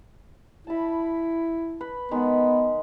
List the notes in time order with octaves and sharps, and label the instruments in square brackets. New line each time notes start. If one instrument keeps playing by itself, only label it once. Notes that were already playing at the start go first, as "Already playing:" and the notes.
[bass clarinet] E4 [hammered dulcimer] A5 B5
[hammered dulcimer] B4
[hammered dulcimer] D#3 G#3 [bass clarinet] B3